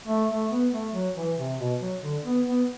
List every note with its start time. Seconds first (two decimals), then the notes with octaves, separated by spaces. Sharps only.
0.07 A3
0.29 A3
0.51 B3
0.72 A3
0.93 F#3
1.16 E3
1.37 C3
1.59 B2
1.80 F#3
2.02 D3
2.24 B3
2.46 B3